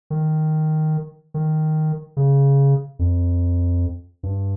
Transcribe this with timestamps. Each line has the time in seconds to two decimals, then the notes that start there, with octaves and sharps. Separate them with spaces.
0.10 D#3
1.34 D#3
2.17 C#3
2.99 F2
4.23 G2